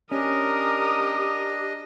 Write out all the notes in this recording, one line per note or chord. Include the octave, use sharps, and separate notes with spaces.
C#4 D4 G4 A#4 D#5 D#6